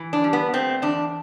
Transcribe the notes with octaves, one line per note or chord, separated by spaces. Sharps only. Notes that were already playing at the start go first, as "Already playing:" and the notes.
Already playing: E3
D4
G3
B3
A3 C4
E2 D4